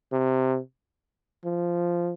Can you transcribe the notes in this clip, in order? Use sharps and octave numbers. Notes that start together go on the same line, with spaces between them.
C3
F3